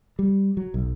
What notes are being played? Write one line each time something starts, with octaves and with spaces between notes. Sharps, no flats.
G3
F#3
B1